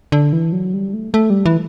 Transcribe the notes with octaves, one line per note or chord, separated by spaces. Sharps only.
D3
E3
F#3
G3
A3
A3
G3
E3